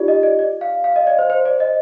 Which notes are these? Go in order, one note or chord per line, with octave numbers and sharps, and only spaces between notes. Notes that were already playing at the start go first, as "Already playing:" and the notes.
Already playing: D#4 F4 G4 D5
D#5
D5
D5
F5
F5
D#5
D5
C5
C5
D5
D#5